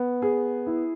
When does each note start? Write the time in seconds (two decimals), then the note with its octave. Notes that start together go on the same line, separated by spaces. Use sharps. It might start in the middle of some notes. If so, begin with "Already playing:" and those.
Already playing: B3
0.22 G#4
0.67 E4